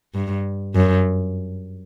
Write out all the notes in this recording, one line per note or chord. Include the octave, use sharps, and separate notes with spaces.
G2
F#2